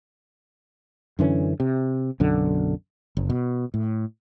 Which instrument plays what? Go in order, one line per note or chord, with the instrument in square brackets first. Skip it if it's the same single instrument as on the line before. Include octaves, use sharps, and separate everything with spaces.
[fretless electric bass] F#2 D3 E3 C#4
C3
B1 F#2 D3
F#1
B2
A2